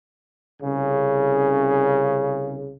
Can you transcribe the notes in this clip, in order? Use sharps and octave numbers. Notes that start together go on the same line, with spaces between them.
C2 C#3